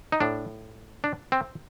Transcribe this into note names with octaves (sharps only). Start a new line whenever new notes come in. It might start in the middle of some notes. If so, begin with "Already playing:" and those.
D#4
A2 D4
D4
C4